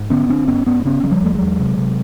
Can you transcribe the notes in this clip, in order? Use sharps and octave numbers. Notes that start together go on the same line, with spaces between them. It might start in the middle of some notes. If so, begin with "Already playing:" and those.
Already playing: G#2
D3 B3 C#4
D3 C4 D4
G2 B3 C#4
G2 B3 C#4
C4
C#3 B3 C#4
C#3 F#3
F3 G3
E2 A3
F#3 G#3
E2
C3
C3